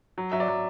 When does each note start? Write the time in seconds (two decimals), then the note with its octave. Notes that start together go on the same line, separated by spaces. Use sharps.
0.18 F#3
0.32 F#3 E5
0.40 D5
0.48 F#3